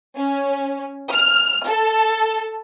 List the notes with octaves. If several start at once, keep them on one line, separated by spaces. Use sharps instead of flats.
C#4
F6
A4